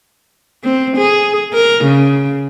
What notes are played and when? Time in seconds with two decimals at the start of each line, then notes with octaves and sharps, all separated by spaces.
0.64 C4
0.97 G#4
1.53 A#4
1.84 C#3